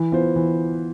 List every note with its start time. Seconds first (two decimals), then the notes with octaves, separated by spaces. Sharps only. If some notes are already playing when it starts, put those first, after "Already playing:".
Already playing: E3
0.12 B3 F4 C5
0.36 E3